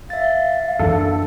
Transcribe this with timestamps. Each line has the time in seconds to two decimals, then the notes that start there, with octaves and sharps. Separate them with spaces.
0.10 E5 F5 A6
0.79 F#2 E3 D4 A4